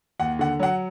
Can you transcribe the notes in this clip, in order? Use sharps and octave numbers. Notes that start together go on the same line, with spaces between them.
D#2 F#5
D3 F#5
F#3 F#5